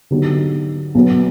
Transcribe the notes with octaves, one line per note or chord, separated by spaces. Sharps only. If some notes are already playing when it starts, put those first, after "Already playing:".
D3 F#3 B3 D#4 G4
B1 B2 F#3 B3